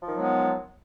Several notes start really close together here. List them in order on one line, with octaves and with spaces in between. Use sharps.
F3 D#3 F#3 G#3 B3